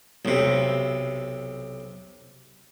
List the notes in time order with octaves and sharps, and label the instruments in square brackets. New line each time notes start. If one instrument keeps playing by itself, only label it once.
[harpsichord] B1 C3